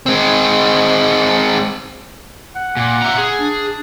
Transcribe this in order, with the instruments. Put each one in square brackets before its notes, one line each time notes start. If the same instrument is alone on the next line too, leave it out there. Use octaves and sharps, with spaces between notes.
[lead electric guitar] G#3 C4
[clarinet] F#5
[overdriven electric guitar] A#2
E5 A#5
G#4
[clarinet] D4